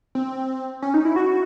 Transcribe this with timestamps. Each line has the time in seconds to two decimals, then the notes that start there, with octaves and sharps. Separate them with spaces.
0.15 C4
0.82 C#4
0.94 D#4
1.05 E4
1.16 F#4